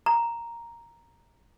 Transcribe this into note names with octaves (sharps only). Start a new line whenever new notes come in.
A#5